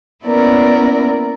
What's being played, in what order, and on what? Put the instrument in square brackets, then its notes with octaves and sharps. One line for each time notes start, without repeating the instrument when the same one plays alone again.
[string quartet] A#3 B3 C#4 E4 A#4 D5